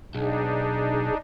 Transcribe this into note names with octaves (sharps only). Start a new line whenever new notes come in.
B1 D4 D#4 G#4